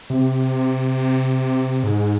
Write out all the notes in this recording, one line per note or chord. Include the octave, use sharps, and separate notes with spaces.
C3
G#2